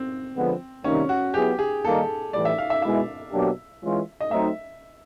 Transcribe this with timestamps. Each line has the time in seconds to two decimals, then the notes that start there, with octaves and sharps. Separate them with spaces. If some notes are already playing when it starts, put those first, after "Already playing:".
Already playing: C4
0.35 D3 F3 G#3 B3
0.84 C3 D#3 G3 A#3 C#4 D#4
1.09 F#4
1.34 F#3 B3 E4 G4 G#4
1.59 G#4
1.84 D#3 G3 A#3 D#4 A4
2.33 A2 E3 G3 D5
2.45 E5
2.58 F5
2.70 E5
2.82 B2 G#3 B3 E4 E5
3.32 B2 F#3 A#3 D4 G4
3.82 E3 G#3 C#4 F4
4.20 D#5
4.31 F#3 A3 C4 D#4 E5